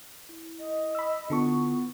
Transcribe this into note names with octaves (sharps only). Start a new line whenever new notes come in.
E4
D#5
B5 E6
D3 B3 E4 F4 A4 C#6